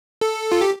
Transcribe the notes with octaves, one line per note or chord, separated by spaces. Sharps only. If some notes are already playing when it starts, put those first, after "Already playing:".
A4
F4
G4